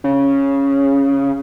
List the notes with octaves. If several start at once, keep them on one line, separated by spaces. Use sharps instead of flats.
C#3